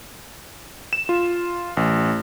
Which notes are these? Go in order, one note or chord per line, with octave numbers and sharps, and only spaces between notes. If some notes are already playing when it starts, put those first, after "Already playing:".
E7
F4
A1